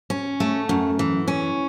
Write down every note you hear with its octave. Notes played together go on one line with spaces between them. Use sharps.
C#4
A3
F#2
E3
C#4